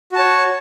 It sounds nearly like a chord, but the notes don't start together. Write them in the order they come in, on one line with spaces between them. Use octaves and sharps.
F#4 A5 C#5